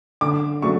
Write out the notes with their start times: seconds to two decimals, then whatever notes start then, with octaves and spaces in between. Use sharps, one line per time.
0.21 D3 D6
0.62 F#3 A3 D4 C#6